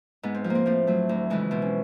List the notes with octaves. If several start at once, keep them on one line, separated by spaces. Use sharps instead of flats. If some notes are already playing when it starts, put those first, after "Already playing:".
G#2 B3
C4
F3
A#3
C4
A2 C4
F#3 A3
D2
C#3 E3 G#3
B2 C4
C#4